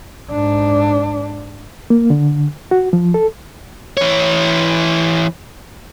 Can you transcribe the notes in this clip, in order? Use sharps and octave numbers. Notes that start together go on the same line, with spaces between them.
G#2 D4
A#3
D3
F#4
F3
A4
E3 C#5